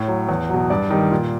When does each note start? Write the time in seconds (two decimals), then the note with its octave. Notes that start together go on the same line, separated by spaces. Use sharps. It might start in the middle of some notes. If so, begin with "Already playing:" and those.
Already playing: A2 C#5
0.08 F#3
0.29 E2
0.49 B2 F#3
0.70 G2 D5
0.90 D#3 G3
1.11 A#2